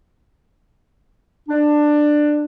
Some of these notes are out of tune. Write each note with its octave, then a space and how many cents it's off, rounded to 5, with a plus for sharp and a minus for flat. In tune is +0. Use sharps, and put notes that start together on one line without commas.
D4 +15